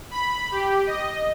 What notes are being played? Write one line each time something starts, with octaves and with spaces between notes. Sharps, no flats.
B5
G4
D#5